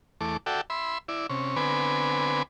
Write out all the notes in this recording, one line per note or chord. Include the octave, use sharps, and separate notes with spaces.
E2 A3 D6
F#4 A4 D5 E5 G5
E5 B5 C6
E4 D5
C3 C#4
D3 B3 C4 B4 G#5 D6